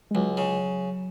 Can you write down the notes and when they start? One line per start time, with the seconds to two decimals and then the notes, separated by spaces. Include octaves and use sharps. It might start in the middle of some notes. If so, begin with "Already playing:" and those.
0.11 G#3
0.15 C#2 F#3
0.37 C#3